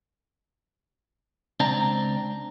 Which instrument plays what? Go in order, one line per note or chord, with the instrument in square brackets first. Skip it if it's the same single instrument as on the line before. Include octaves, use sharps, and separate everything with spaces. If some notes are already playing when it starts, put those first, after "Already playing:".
[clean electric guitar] C#2 C4 D4 [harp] A#5